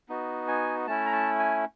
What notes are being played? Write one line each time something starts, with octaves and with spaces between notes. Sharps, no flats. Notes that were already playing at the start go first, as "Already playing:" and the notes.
B3 D#4 F#4
G#5
A3 C#4 E4 A5
A#5
A5
G#5